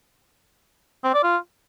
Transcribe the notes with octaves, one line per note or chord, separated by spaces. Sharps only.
C4
D5
F4